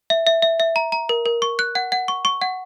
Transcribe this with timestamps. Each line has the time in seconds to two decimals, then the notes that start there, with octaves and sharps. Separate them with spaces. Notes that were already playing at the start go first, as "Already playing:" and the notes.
0.10 E5
0.27 E5
0.42 E5
0.60 E5
0.76 A#5
0.92 A#5
1.09 A#4
1.26 A#4
1.42 C#6
1.59 F#6
1.75 F#5
1.92 F#5
2.08 C#6
2.25 C#6
2.41 F#5